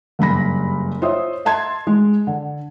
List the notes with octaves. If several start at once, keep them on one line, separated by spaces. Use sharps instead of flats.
F#1 G2 B5 A#6
F4 C5 C#5 D#5 E5 D#6
D#5 E5 A5 C6 G#6
G#3
D3